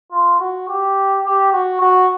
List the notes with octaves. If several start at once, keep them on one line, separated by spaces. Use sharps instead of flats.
F4
F#4
G4
G4
F#4
F#4